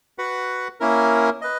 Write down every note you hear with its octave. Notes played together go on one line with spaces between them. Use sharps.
F#4 B4 F#5
A#3 C#4 E4 A#4
B4 D#5